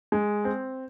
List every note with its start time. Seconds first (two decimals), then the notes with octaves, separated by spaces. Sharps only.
0.12 G#3
0.45 C4